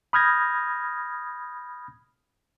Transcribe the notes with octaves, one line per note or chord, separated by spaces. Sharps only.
B5 D#6 F6 G6 G#6 A#6